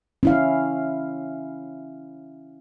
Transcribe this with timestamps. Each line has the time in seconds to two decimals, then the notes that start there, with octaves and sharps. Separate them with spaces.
0.23 C#4 E4 F5